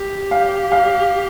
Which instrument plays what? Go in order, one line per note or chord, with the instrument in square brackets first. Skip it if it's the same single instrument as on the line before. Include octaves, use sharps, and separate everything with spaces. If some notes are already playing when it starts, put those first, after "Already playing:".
Already playing: [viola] G4
[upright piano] F5
F5